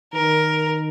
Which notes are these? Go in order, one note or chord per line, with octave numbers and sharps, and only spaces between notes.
D#3 A#4